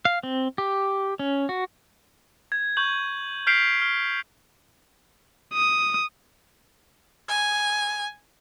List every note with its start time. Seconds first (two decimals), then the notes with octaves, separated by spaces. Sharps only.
0.05 F5
0.23 C4
0.58 G4
1.19 C#4
1.49 F#4
2.52 G#6
2.77 C#6 G6 F#7
3.47 F6 G6 B6 C7 D7 F7
3.81 F6
5.54 D#6
7.29 G#5